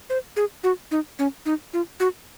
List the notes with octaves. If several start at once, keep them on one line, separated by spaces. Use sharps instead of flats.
C5
G#4
F#4
D#4
C#4
D#4
F4
F#4